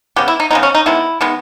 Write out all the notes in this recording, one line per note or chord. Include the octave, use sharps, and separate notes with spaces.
C#3 G#3 B3 G4
E4
D#4
C#3 G#3 B3 D#4
C#4
D#4
D#3 G#3 B3 E4
D#3 G#3 B3